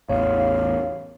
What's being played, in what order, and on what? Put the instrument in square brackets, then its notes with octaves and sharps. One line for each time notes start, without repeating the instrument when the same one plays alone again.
[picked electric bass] A1 E2 [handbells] C#5 [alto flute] F5